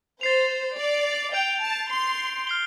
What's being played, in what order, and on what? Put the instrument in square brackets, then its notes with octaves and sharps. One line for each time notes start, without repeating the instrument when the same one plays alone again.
[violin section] C5 [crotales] A6 C7 F7
[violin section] D5
[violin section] G5 [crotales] G6 D7 F7
[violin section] A5
C6
[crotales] F6 C7 G7